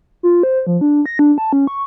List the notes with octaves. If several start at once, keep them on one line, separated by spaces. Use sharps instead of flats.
F4
C5
F3
D4
A#6
D4
A5
C#4
C#6